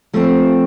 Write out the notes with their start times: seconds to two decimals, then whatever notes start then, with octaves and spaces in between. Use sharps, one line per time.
0.14 F3 A3 C4